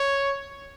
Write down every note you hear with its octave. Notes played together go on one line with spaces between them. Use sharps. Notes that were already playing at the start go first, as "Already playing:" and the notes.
Already playing: C#5